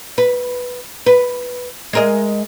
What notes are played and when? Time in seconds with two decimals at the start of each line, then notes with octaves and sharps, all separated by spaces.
0.18 B4
1.06 B4
1.93 G#3 A#4 D#5